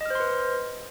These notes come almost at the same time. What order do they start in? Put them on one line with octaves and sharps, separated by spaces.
D#5 F6 C5 C6 B4